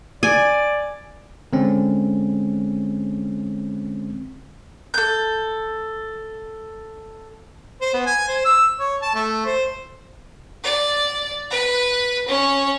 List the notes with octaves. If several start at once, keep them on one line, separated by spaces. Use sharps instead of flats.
D5 G#5
D3 G#3 C4 C#4
A4 G6
C5
B3
G#5
C5
E6
C#5
A5
A3
C5
D5
B4
C#4